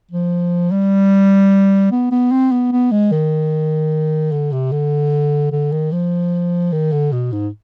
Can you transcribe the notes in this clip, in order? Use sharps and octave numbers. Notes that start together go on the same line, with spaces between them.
F3
G3
B3
B3
C4
B3
B3
G#3
D#3
D3
C3
D3
D3
D#3
F3
D#3
D3
B2
G#2